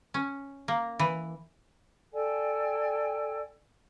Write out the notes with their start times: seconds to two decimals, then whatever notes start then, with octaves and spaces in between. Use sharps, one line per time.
0.14 C#4
0.68 A#3
0.99 E3
2.14 A4 D5 G5 G#5